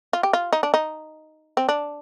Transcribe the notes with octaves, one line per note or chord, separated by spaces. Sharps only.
F4
G4
F4
D#4
D4
D#4
C4
D4